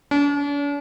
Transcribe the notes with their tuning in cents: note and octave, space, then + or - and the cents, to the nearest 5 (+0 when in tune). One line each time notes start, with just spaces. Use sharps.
D4 -45